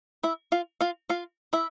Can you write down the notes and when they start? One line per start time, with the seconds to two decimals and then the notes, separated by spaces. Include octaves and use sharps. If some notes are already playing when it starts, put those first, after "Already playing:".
0.23 E4 E5
0.52 F4 F5
0.81 F4 F5
1.09 F4 F5
1.53 E4 E5